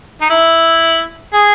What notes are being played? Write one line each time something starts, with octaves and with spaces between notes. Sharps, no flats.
D#4
E4
G#4